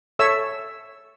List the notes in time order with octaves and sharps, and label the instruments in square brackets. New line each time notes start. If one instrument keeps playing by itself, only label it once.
[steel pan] A4 C#5 E5 E6